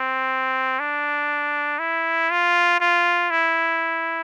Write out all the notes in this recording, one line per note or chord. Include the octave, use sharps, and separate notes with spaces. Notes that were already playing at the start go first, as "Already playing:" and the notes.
Already playing: C4
D4
E4
F4
F4
E4